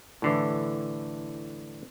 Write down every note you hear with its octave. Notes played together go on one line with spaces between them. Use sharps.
A2 D3 E3